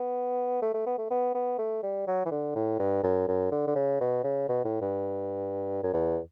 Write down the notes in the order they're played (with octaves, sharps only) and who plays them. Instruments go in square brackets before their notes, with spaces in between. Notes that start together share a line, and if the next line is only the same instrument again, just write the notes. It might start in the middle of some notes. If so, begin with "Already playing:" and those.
Already playing: [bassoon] B3
A3
A3
B3
A3
B3
B3
A3
G3
F#3
E3
D3
A2
G2
F#2
F#2
D3
D3
C#3
B2
C#3
B2
A2
G2
F#2
E2